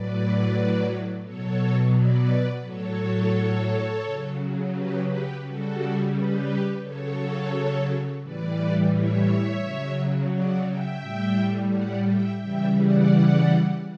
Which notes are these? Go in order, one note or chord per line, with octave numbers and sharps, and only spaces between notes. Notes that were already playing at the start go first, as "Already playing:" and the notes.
Already playing: A2 F#3 B4 D5
B2 F#3 A4 C#5
B4 D5
A2 F#3 A4 C#5
C#3 F#3
G4 B4
G4 B4
C#3 G3 F#4 A4
G4 B4
C#3 F#3 A4 C#5
A2 E3 G3 B4 D5
C#5 E5
C#3 F#3
D5 F#5
E5 G5
A2 G3
D5 F#5
E5 G5
C#3 E3 G3 E5 G5
D5 F#5